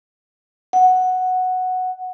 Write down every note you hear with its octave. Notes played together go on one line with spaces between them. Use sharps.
F#5